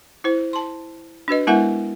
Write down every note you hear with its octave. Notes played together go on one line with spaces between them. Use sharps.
E4 C5
A5 C6
D4 F#4 B4 D#5
G#3 B3 E4 A#4 E5 F#5